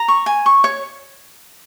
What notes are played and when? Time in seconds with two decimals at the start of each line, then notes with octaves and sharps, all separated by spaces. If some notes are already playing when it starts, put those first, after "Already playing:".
Already playing: A#5
0.08 C#6
0.26 G#5
0.46 C#6
0.64 C#5